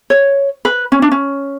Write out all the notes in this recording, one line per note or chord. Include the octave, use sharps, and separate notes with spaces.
C#5
B4
C#4
D4
C#4